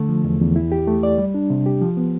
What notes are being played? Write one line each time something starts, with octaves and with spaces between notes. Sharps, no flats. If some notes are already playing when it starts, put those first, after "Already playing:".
Already playing: D3 A3
F3
E2
E2
E4
G4
A3
D5
G3
D4
C3
G4
F3
B3